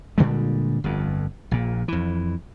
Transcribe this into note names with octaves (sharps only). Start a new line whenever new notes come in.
A#2 D3 G3 G#3
G1 F2
A#1 A#2
F2 E3